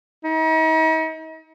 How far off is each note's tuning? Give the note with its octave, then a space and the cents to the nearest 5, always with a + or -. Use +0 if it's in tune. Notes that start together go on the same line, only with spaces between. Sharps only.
D#4 +40